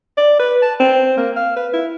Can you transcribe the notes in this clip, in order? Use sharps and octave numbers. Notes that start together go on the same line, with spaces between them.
D5
B4
A5
C4
A#3
F5
B4
E4